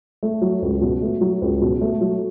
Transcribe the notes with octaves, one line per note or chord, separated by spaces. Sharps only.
A3
F#3
C#2
B2
A3
F#3
C#2
B2
A3
F#3